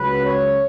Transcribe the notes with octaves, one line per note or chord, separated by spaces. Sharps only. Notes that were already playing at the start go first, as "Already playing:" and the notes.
Already playing: C#2 C#3 F#3 B4
C#5